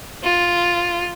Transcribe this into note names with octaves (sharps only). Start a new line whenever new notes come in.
F4